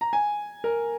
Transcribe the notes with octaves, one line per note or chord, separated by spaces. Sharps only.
A#5
G#5
A#4